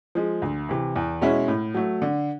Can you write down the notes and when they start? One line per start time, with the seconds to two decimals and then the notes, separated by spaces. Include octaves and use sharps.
0.15 F3 G#3
0.42 D2
0.69 C3 E3
0.96 E2
1.22 B2 G#3 C#4 E4
1.48 A2
1.74 F#3 A3
2.02 D3